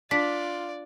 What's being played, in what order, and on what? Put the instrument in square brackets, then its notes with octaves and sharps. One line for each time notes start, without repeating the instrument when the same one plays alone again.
[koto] D4 [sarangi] F4 [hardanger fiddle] D5 [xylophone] B6